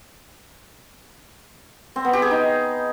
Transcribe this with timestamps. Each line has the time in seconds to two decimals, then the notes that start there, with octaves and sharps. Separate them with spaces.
1.96 C4
2.05 B3
2.13 G4
2.22 G#4
2.31 D#4